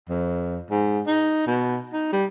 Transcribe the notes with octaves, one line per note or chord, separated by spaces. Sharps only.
F2
G#2
D#4
B2
D#4
G3